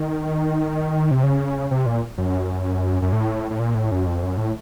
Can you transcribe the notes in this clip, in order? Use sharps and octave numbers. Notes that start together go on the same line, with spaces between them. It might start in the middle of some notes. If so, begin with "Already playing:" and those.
Already playing: D#3
C3
C#3
C3
A#2
F#2
F#2
A2
A2
A#2
A2
F#2
F2
F#2
A2